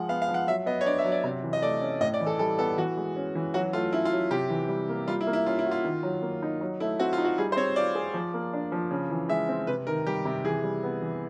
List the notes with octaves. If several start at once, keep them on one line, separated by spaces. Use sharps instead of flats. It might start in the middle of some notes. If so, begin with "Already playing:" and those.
Already playing: F3 G#3 F#5
B3 F5
F5
F3
F#5
F#3 E5
B3 D#5
C#5
D4 D5
E5
F#3
D5
C3
E3
D#5
A3 D5
C#4
A2 D#5
D5
E3
A4
G3 A4
B3 A4
E3 F#4
G#3
C#4
E3
F#3 F#4
A3 F4
C#4 E4
F4
F#3
C3 G4
E3
G3
A#3
G3 F4
E4
A#3
E4
C#4 F4
E4
F#4
F4
D#3
F#3
A#3
D#4
F#3
A3 E4
C4 F#4
F4
D#4
F#4
G3 G#4
C5
C4 C#5
F4 D5
G#4
F3
A#3
D4
F3
C#3
E3
G#3 E5
C4
C3 B4
D#3 A#4
G3 G4
C3
E3 G#4
G3
B3
E3